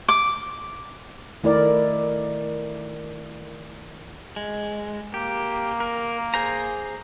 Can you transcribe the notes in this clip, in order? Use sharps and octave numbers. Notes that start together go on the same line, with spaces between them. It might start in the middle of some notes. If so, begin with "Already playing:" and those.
D6
D#3 A3 E4 A#4 D5
G#3
A#3 G4
A#4
G#4 C5 A#5